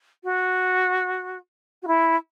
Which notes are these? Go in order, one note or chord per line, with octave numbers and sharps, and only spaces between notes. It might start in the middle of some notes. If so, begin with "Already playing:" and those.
F#4
F#4
E4